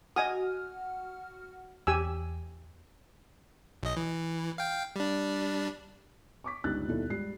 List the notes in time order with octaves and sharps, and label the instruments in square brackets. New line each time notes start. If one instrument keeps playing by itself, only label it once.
[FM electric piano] F#4 F#5 F6 [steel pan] D#5 G#5 D#6
[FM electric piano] E2 [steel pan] G4 G#5 E6
[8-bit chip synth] B1 D#5
E3
F5 G5
G3 D4
[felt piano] C#6 D6 B6
G1 C#2 G3 D#4 F#6 A6
D#2 B2 G3 D#4 E4 A4
G#2 G3 C7